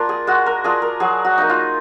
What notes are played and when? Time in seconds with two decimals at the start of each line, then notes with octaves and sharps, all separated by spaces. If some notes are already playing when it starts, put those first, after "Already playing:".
Already playing: A#3 D4 F4 A#4
0.09 G#4
0.27 G#3 F#4
0.46 A#4
0.64 D4 F4 G#4
0.82 A#4
1.00 F#3 G#4
1.25 F#4
1.38 A#3 D#4
1.50 F4